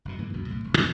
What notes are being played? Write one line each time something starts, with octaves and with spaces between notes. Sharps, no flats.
F#1 B2
G#2 E3 A#3
C#2 F#2 B2
B1 A2
E1
A#2 C#3 E3 A#3